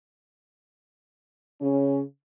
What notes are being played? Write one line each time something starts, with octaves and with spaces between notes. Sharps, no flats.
C#3 C#4